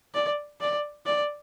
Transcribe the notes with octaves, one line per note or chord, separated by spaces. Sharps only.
D5
D5
D5